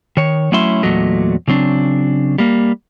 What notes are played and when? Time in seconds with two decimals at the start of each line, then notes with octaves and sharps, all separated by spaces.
0.17 D#3 C#5
0.52 F#3 A3 C#4 E4 E5 C6
0.83 E2 A#2 F#3 A3 D#5
1.48 C#3 F#3 C4 D4
2.38 G3 A#3